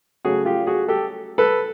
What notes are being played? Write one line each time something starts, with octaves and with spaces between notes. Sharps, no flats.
C#3 F#3 A3 F#4 G#4
F4 G4
F#4 G#4
G4 A4
A4 B4